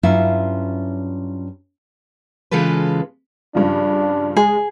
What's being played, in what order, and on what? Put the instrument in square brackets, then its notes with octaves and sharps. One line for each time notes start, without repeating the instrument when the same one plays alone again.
[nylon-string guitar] G2 F#3 C#4 E4 F4 F5
[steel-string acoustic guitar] C#3 E3 G#3 F4 A4 B4
[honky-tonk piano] G2 C#3 F3 [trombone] D4
[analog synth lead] G#3 [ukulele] G#4